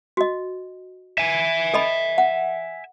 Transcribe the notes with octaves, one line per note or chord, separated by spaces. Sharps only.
F#4 D#5
E5 G#5
A4 D#5 B5
F#5